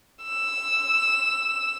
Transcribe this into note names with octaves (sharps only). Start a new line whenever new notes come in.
E6